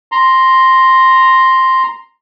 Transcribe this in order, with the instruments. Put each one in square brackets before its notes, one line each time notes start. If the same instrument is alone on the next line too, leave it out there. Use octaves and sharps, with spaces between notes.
[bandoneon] A#5 C6